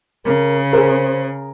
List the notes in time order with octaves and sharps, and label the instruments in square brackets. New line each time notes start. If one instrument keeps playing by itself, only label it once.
[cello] C#3 [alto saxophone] A#4
[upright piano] G#4 A#4 [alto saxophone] C5